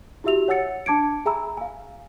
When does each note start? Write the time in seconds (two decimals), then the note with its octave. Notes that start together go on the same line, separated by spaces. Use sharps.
0.24 E4 F#4 G4 E5 E6 F7
0.48 C#5 F#5 G#5 E6 A6 C#7
0.86 D4 A5 D6 G#6 C#7 D7
1.25 G#4 E5 G#5 A#5 B5 E6
1.57 F5 G#5